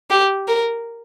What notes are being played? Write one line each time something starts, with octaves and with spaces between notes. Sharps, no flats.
G4
A#4